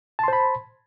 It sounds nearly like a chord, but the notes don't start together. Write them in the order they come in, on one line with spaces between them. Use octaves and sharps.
A5 C6 C5 B5